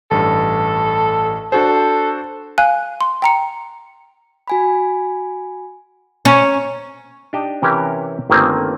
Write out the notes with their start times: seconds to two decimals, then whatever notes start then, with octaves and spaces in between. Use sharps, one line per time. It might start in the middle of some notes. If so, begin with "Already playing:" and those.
0.11 A1 G2 A4
1.52 D4 F#4 A4 C5
2.58 F5 G#5 F#6
3.01 C6
3.22 G5 A#5 C#7
4.48 F#4 G#5 B5
6.25 C#4 A#5
7.33 D4 D#4 G4 D#5 A5
7.62 C3 E3 C#4 E4 G4 A#4
8.30 G1 D#3 A3 A#3 C4 G#5